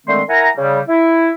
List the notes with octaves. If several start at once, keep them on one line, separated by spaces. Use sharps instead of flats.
D3 D#3 G#3 A3 C4 C6
E4 A#4 F#5 G#5 A#5
C#3 G3
E4